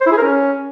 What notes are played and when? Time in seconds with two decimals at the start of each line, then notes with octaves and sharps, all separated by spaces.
0.01 C5
0.06 E4
0.12 G#4
0.17 A#4
0.23 C#4